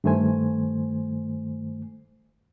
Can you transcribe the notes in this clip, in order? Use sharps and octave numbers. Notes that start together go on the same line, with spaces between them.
G2 D#3 A3 C5 G#5